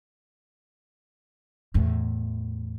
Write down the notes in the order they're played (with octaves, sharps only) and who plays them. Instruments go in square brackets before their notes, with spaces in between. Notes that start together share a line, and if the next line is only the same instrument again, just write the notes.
[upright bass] E2 A2